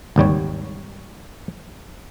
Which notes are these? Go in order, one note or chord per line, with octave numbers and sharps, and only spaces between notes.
G#1 D#2 G3 C#5